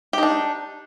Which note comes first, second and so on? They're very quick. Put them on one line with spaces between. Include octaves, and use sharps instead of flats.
G4 D#4 D4